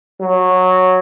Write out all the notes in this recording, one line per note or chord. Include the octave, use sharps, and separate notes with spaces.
F#3